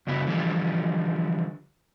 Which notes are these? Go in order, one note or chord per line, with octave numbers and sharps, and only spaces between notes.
F#2 C#3 B3 E4
D3 E3 F3 G3